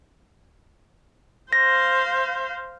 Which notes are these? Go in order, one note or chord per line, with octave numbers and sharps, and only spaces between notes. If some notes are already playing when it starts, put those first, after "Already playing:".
C5 F5 A#6